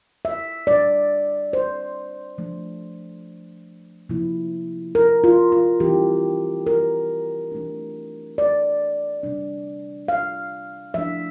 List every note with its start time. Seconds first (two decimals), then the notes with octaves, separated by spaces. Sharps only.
0.25 E5
0.67 A#2 G3 D4 D5
1.53 C5
2.38 F3 A3 D4
4.09 C3 F3 A#3 E4
4.95 A#4
5.24 F4
5.52 F4
5.80 E3 G3 C4 E4 G4
6.67 A#4
7.52 E3 A3 D4
8.38 D5
9.23 C3 G3 D4
10.08 F5
10.94 F3 A3 D4 E5